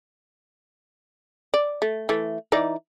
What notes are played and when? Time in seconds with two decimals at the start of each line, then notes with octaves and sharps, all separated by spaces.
1.54 D5
1.82 A3
2.09 E3 A3
2.52 E3 D#4 D5